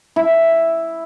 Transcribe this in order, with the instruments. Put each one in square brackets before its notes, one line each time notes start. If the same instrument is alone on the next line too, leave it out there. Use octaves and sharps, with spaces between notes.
[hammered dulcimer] E4